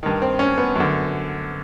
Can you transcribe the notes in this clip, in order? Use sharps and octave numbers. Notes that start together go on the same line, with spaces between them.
G2 D#3
C4
C#4
B3
F#2 D3